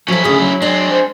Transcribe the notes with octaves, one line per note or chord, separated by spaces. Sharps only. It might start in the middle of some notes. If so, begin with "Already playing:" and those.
F3 F#3 C#4 E4 A4
D2 C#3 G#4
F#3
G#3 C4 D4
C5